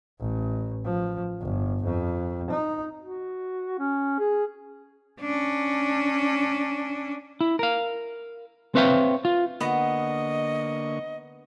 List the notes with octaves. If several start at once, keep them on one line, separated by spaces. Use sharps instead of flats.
A1
F3
G1
F2
D#4
F#4
C#4
G#4
C#4 D4
E4
A#4 F5
C4 B4 C#5 E5 F5 G5
F4
D3 A#3 B3 D#5 C#6